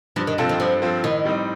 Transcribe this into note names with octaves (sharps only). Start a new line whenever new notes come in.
G2 F3
D#3
C3 F3 C4 F4 A4
D#3
G2 F3
F3 C4 F4 A4
A2 D#3
G3 C4 D#4